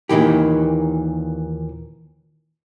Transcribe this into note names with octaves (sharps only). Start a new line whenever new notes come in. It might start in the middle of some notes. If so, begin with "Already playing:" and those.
D#2 A#2 D#3 E3 G4